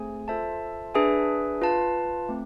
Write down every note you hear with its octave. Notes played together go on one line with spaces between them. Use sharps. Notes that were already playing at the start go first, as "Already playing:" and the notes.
Already playing: A3 C4 G#4 C5 G#5
F4 A4 C5 E5 A5
D4 G#4 B4 E5 G#5
F4 B4 F5 A5
A3 C4